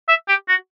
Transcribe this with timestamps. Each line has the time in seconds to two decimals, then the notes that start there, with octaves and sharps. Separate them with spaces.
0.08 E5
0.28 G4
0.48 F#4